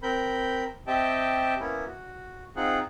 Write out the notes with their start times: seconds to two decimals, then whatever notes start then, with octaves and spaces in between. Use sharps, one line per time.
0.03 C4 A#4 B5 G6
0.87 C4 G4 D#5 E5 G5 A5
1.60 A#3 B3 C#4 E4
1.87 F#4
2.56 C4 D#4 F4 G#4 F#5